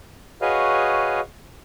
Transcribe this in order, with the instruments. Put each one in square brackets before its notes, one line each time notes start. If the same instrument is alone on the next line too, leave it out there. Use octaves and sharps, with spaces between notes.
[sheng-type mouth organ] F#4 G#4 B4 C#5 D#5 F5